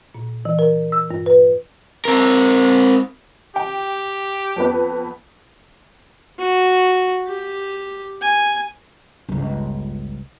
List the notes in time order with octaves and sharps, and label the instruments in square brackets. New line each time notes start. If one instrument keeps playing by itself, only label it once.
[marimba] A#2
E3
A#4
E6
G2
B4
[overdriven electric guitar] C4 A#4
[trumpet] G4 [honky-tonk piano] G5
[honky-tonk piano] F2 B3 B4
[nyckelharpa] F#4
G4
G#5
[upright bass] G1 C#2